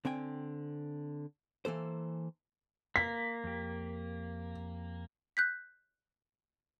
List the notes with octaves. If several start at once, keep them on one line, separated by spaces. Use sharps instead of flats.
D3 C4 G5 G#5
E3 A#3 A4 C5
A#3 B6
F2 G4
F#6 G6 B6